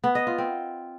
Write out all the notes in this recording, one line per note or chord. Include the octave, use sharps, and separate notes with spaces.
B3
D#5
F4
C4